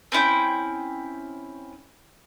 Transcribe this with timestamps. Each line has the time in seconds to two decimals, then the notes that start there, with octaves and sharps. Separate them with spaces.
0.12 C4 C#4 E4 G5